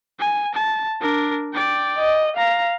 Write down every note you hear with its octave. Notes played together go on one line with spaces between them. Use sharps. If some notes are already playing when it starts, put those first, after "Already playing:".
G#5
A5
D4 A#4
D5 G5
D#5
F5 A#5